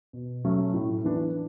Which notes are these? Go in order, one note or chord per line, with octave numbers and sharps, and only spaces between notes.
B2
F#3 A3 C#4
A2
E3 B3 D4